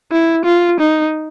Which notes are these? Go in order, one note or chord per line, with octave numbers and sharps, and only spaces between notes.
E4
F4
D#4